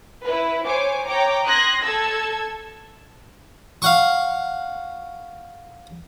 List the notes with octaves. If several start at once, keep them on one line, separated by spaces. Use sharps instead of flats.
E4 B4
C5 C#5 G#5 D6
C#5 G5 A#5 D6
C6 D#6 F#6 G#6 A#6
A4 A5 E6 G#6
F5 F#5 C#6